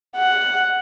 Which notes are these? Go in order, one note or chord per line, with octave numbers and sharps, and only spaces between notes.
F#5